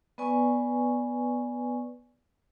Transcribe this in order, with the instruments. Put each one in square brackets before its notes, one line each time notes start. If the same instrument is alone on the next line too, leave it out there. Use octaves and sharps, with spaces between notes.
[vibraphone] B3 B4 D5 G#5 C#6